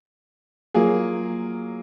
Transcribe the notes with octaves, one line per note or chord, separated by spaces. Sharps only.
F#3 A#3 F4 G#4